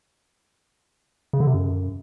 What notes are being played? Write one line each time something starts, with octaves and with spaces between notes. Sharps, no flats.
C#3
D3
C3
F#2